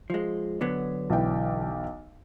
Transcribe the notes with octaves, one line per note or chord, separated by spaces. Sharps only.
F3 G#3
D3 F#3 B3
B1 E3 G5